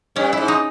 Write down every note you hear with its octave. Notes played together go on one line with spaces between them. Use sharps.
G2 C#4
G#2 E4
D#4